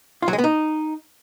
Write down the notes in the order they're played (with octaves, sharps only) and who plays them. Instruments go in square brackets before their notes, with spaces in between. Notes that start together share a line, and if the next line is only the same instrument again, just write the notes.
[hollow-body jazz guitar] F4
F#3
G#3
B3
D#4